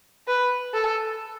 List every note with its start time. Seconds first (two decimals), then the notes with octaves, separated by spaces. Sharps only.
0.28 B4
0.74 A4